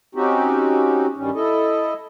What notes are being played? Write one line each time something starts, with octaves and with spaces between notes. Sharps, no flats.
C4 C#4 D#4 F#4 G4
G2 D#3 G3 C#4
E4 A4 D#5